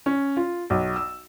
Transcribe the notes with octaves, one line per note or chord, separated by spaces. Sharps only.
C#4
F4
B1
E6